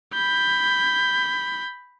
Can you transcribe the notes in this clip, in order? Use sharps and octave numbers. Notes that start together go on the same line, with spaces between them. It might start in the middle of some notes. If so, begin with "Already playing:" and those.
B5 G6